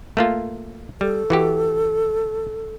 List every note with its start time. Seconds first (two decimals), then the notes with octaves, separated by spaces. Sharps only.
0.17 A3 A#3 F4
1.01 G3 A4
1.30 E3 F#4 G4